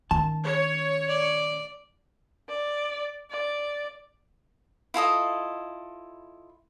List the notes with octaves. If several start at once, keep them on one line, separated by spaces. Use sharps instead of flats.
D#3 C#4 A5
C#5
D5
D5
D5
E4 F4 A4 D#5